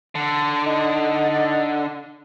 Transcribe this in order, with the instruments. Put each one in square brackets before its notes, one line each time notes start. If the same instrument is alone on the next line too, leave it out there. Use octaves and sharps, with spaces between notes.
[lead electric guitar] D3
[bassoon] D#4